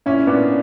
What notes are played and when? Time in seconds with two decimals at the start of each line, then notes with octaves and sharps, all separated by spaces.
0.06 A#2 C#4 E4
0.27 A#2 B3 D4